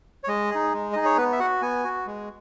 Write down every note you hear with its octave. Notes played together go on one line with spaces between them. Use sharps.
C#5
G#3 D#5
D#4 G#4
G#3
D#4 G#4 D#5
C#5
B3 B4
E5
F#4 F#5
B3 G#5
F#4
G#3